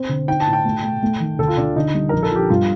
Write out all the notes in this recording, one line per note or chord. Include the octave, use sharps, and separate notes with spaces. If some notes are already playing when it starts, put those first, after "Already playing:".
Already playing: C4
D3
D#4 G5
A5
A2
G5
A3
A3
A3
D#3
D2 A4
F4
D2 D4
D3 D#4
G3
A#1 A#4
A4
F3 G4
G2 F4